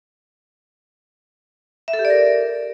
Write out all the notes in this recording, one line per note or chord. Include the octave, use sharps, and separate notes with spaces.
E5
A4
G4
D5
A#4